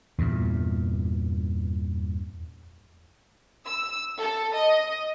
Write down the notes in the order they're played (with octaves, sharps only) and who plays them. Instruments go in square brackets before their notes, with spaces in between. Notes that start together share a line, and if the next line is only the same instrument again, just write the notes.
[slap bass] E2 G2 A#2
[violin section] E6
A4
D#5